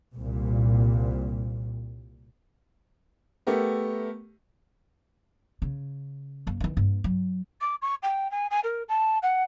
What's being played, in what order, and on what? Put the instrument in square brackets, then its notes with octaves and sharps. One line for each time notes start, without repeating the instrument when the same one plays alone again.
[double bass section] C2 A#2
[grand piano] A3 B3 G4 A#4
[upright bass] C#3
F#1 A#3
D#3 E3
G2 A#3
F#3
[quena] D6
C#6
G5
G#5
G#5
A#4
A5
F#5